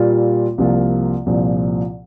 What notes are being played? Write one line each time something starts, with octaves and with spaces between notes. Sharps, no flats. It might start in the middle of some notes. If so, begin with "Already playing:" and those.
Already playing: A#2 G3 A#3 F4
C2 C3 F3 A#3 F4
C2 A#2 F3